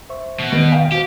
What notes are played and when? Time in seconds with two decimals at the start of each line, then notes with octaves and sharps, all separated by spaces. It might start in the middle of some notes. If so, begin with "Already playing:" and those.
0.09 C5 E5 C#6
0.39 B2
0.52 E1 D#3 B3 D#5 G6 D7
0.72 F5 G5
0.92 F#4 G4 C5